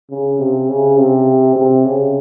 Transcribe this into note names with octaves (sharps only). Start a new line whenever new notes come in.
C#3
C3
C#3
C3
C3
C#3